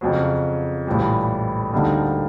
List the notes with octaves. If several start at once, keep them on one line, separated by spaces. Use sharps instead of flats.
F2 C#3 F#3
A#1 A2 E3 G3
D2 D3 G3 A#3 D#4